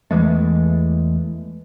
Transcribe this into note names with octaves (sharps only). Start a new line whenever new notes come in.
E2 E3 G#3 A3